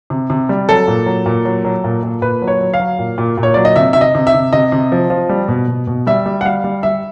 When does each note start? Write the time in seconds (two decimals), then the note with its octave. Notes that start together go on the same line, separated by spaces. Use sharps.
0.10 C3
0.30 C3
0.49 G3
0.69 F#3 A4
0.88 A#2
1.06 F#3
1.26 A#2
1.45 F#3
1.65 F#3
1.84 A#2
2.03 A#2
2.22 A#2 B4
2.42 F#3
2.48 C#5
2.61 F#3
2.74 F5
2.80 F#3
2.99 A#2
3.18 A#2
3.38 A#2
3.43 C#5
3.54 F#3 D5
3.65 D#5
3.76 C3 E5
3.93 C3 E5
4.01 D#5
4.15 C3
4.27 E5
4.34 C3
4.53 C3 D#5
4.72 C3
4.92 F3
5.10 F3
5.29 G3
5.48 B2
5.68 B2
5.87 B2
6.07 G3 E5
6.26 G3
6.41 F#5
6.45 G3 F5
6.64 G3
6.83 G3 E5